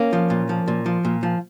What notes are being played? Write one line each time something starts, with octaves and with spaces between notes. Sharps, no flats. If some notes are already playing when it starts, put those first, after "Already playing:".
Already playing: A#3 C#4
F3
A#2
F3
A#2
F3
A#2
F3